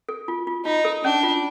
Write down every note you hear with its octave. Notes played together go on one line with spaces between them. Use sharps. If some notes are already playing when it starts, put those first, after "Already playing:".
A4
F4
F4
D#4 F4
A4
C#4 D4
F4